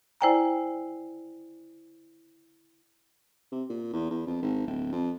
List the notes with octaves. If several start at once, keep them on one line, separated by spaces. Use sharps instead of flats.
E4 C5 D5 G5 G#5 A#5
C3
A#2
E2
E2
F2
G#1
D1
F2